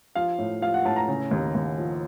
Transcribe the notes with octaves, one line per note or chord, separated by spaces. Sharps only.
F3 F5
A2
F3 F5
F#5
A2 A5
A#5
C#3
D#2
D#2
F3